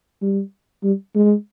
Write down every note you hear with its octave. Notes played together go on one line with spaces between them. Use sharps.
G3
G3
G#3